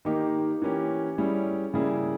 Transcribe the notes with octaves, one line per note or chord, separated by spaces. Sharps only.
D#3 A#3 D#4 G4
E3 A#3 C#4 G4
G3 C#4 E4 G#4
C#3 G3 A#3 E4 G#4